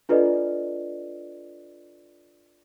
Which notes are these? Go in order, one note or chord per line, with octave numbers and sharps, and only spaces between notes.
D4 F4 A4 B4 D5 D#5